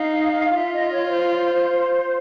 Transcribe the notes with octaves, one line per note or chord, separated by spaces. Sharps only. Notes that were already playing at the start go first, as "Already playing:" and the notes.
Already playing: D#4 F5
F4 E5
D#5
C#5
C5